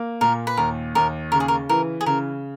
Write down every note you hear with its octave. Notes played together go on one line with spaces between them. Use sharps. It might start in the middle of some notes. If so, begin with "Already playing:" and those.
Already playing: A#3
A#2 A#4
B4
D#2 A#4
D#2 A#4
C#3 A#4
G#4
A#4
E3 A#4
G#4
C#3 A#4